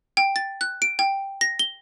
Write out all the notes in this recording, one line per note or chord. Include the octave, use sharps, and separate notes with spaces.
G5
A6
F#6
D7
G5
A#6
G7